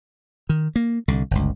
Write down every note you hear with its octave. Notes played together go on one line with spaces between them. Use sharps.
D#3
A#3
C2 D3
G1 C#2